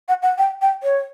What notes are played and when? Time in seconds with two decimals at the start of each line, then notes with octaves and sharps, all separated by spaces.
0.09 F#5
0.23 F#5
0.38 G5
0.62 G5
0.83 C#5